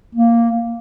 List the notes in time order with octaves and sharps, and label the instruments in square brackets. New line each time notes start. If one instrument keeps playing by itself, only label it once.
[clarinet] A#3